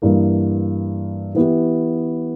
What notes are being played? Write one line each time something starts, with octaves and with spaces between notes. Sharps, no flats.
G2 E3 A#3
E3 B3 E4 G4